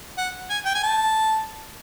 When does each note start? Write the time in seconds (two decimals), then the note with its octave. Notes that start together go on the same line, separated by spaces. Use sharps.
0.18 F#5
0.50 G#5
0.65 G5
0.75 G#5
0.83 A5